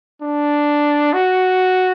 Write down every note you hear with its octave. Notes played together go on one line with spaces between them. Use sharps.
D4
F#4